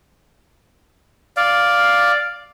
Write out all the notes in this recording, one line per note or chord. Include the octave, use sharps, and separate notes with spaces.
D5 F5